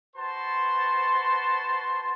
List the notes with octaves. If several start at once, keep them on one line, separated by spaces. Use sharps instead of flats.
F#4 B4 C5 A5 C6